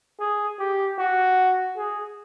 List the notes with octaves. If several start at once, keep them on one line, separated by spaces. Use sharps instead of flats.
G#4
G4
F#4
G#4